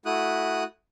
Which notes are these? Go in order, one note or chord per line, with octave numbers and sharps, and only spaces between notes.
A3 E4 F#4 D#6 F#6